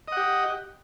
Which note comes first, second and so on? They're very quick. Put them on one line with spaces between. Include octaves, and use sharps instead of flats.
D#5 F#5 G4